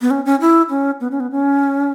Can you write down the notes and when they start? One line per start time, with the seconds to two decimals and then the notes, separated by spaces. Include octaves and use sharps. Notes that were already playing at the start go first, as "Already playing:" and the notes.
0.01 B3
0.11 C#4
0.25 C#4
0.41 E4
0.70 C#4
1.01 B3
1.11 C#4
1.20 B3
1.31 C#4